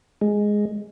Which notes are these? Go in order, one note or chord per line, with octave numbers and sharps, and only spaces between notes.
G#3